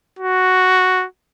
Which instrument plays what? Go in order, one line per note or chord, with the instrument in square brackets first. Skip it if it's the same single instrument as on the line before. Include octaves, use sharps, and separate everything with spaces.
[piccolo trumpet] F#4